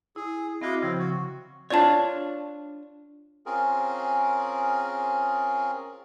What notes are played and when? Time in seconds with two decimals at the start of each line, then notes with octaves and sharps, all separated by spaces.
0.16 E4 G#4
0.62 C4 E4 F#4 D#5 F5 D6
0.82 C#3 F3 C4
0.99 F#4
1.70 D4 F4 C#5 D5 A5
3.46 C4 C#4 F4 G#4 A#4